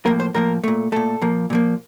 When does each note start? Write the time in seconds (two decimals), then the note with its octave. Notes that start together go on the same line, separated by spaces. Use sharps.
0.06 A2 F3 A#3 A#4
0.20 C5
0.34 A2 F3 A#3 A#4
0.64 A#2 A3
0.92 A#2 A3 A4
1.22 A#2 F3 A#3
1.50 A#2 F3 A#3